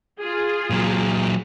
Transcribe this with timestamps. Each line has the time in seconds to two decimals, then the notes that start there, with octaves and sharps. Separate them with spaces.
0.20 F4 G#4
0.70 A#2 F#3